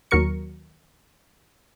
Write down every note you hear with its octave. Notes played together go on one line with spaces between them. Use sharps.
D#2 F#3 A#4 C#6 C#7